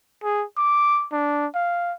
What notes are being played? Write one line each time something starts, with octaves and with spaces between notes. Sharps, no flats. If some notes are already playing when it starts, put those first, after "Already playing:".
G#4
D6
D4
F5